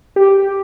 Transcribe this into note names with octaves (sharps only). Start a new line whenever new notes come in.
G4